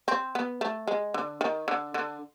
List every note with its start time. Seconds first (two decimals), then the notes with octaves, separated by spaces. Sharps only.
0.08 C4
0.35 B3
0.61 A3
0.88 G#3
1.14 D3
1.41 D#3
1.68 D3
1.94 D3